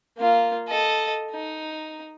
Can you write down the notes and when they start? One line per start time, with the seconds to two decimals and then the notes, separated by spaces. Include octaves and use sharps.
0.18 A#3 F4
0.68 A4 D#5
1.31 D#4